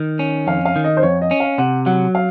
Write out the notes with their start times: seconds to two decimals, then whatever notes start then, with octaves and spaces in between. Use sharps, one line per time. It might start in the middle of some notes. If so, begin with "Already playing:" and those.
Already playing: D#3
0.19 C#4
0.47 F2 F5
0.65 F5
0.76 D#3
0.84 D#5
0.97 C5
1.03 F2 C#5
1.22 D#5
1.31 C#4
1.40 F5
1.58 C3 F#5
1.86 F#3 F#5
2.15 F5